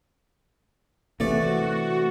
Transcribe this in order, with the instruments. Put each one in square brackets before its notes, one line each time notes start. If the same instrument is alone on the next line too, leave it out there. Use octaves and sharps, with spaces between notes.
[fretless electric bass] C3 E3 [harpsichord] A3 D5 [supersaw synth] F#4